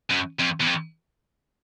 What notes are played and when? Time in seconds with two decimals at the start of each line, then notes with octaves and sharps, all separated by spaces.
0.11 F#2
0.40 F2
0.61 E2
0.67 F2